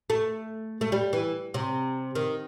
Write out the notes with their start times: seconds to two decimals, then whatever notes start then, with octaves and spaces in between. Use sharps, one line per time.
0.10 A3
0.81 A3
0.92 G3
1.13 E3
1.54 C3
2.15 D#3